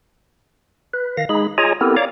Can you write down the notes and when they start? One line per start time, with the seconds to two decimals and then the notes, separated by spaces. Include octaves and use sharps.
0.94 B4
1.17 D#3 F5 A#6
1.29 G#3 D#4 G#4 B5
1.58 F4 G#4 C#5 D#5 G#5 A#5
1.81 B3 C4 E4 G4 A4 A#4
1.97 C#5 D5 F5 A#5 D6